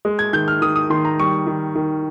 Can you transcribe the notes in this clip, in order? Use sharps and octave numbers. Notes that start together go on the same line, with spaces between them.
G#3
G#6
D#3 G6
F6
D#3 D#6
D#6
D#3 C6
A#5
G3 C#6
D#3
D#3